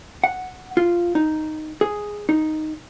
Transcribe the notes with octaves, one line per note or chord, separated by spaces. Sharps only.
F#5
F4
D#4
G#4
D#4